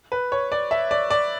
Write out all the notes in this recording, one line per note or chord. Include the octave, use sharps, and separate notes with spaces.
B4
C#5
D5
E5
D5
D5